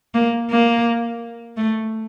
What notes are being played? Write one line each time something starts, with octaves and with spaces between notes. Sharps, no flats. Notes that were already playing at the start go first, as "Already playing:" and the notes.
A#3
A#3
A3